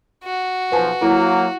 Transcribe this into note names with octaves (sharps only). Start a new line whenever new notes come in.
F#4
B1 F3 B4 G#5 A5
F#3 A#3 E4